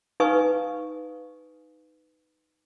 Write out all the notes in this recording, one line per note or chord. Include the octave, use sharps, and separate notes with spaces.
D#4 B4 F5 G#5 C#6 D#6